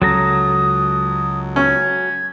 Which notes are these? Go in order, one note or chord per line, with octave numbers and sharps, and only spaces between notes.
C#2 C#3 F#3 A4 A#5 D#6
C#4 G#6